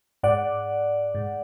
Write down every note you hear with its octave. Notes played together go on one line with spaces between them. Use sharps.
G#2 D5 F#5
G#2